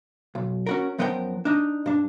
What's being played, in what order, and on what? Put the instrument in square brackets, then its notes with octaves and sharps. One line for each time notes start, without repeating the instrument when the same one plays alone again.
[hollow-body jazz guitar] B1
C#4 F#4 A#4
F#2 F3 B3 A#4 D5 G5
D4 D#4
G2 D4